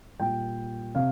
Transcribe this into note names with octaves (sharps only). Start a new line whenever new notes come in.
A#2 G3 G5
C3 F5